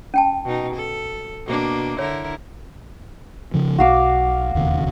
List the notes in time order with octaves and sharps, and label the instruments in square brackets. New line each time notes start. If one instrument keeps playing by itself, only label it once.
[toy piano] C#4 G5 A5
[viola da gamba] B2 D#4
A4
B2 A#3 D4
[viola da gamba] D3 E4 A#4 [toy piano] C#5
[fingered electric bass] C#3 F3
[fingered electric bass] B1 [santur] F#4 F5 D6
[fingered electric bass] E1 D#2 C#3